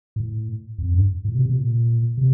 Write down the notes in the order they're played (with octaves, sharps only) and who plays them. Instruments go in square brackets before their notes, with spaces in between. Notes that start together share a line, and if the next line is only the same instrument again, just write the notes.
[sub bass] A2
F2
G2
A2
C3
C3
A#2
C3